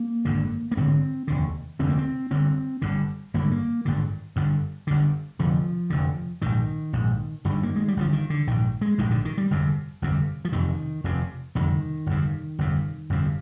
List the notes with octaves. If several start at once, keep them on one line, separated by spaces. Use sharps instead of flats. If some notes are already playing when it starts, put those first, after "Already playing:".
Already playing: A#3
G#1 G2 D3
A#3
G#1 G2 D3 C4
F1 D#2 D3
F1 D#2 D3 C4
A#3
C4
G1 G2 D3 C4
G1 G2 D3
G#1 G2 D3 A#3
G#3
A#3
G#1 G2 D3
G1 G2 D3
G1 G2 D3
F1 F2 D3 F3
F1 F2 D3
A#1 G#2 D#3
A#1 G#2
G1 G2 D3 D#3
A#3
G#3
G3
G1 G2 D3 F3
D#3
D3
A#1 G#2 D#3
G#3
A#1 G#2 D#3
D3
D#3
G3
G1 F2 C3
G1 F2 C3
F3
F1 F2 C3 D#3
F1 F2 C3
G1 F2 C3 D#3
G1 F2 C3
G1 F2 C3
G1 F2 C3